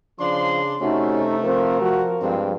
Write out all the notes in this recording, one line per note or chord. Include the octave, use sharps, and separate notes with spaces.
C#3 F3 D4 C6
C3 A3 C#4 D#4 F#4
F3 C4 A#4
F3 F#4
G2 G#3 C4